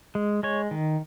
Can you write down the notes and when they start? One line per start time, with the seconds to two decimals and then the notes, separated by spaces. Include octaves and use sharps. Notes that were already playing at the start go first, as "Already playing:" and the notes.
0.15 G#3
0.43 G#3 C#5
0.71 D#3